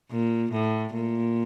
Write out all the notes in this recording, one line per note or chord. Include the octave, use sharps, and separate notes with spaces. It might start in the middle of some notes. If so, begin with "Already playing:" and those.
A#2
A2
A#2